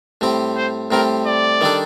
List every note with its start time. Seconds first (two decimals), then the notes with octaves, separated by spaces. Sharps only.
0.21 A2 G3 C4 G4
0.57 C5
0.91 A2 G3 C4 G4 A#4
1.26 D5
1.61 D#3 G3 D4 A4